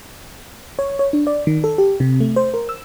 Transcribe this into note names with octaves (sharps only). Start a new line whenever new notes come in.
C#5
C#5
D4
D5
D#3
A4
G4
C3
A3
C5
A#4
E6